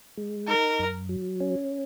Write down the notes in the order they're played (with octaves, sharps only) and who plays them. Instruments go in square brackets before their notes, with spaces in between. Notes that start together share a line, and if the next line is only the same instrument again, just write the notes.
[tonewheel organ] G#3
[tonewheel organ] D#4 [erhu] A#4
[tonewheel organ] F#2
F#3
C#4